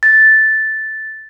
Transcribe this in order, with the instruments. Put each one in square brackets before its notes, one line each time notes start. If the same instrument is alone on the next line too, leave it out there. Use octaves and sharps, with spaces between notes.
[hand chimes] A6